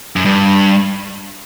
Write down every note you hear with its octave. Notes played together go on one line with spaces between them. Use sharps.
F#2
G2